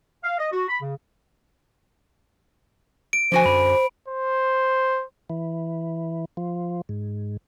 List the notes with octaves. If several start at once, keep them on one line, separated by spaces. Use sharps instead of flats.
F5
D#5
F#4
B5
C#3
D7
D3 F3 F#4 C5 G#5
F#2 B5
C5
E3
F3
G#2